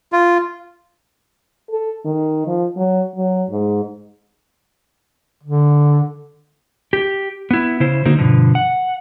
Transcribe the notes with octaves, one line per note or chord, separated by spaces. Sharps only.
F4
A4
D#3
F3
F#3
F#3
G#2
D3
G4
B3 E4
C#3 E4 C5
D3 A#3 D#4 F#4 C5
G2 B2 D3 F3
F#5